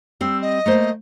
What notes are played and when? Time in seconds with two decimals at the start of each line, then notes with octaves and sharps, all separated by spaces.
0.21 G3 C4 E6
0.41 D#5
0.66 A3 A#3 C5